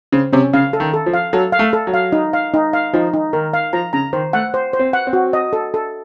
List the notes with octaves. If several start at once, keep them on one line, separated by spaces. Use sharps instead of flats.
C#3 C5
C3 C#4
C#3 F5
A4
D#3
A4
F3
F5
F#3 A4
F5
A3
A4
F#3
F5
D#4
F5
D#4
F5
F3 D#4
D#4
D#3 A#4
F5
F3 A#5
C#3 A#5
D#3 C5
A3 F#5
C5
C5
C4
F#5
C4
F#4
D#5
A4
A4